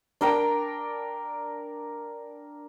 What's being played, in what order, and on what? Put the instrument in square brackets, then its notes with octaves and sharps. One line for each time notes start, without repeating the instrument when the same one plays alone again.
[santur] D4 A#4 G5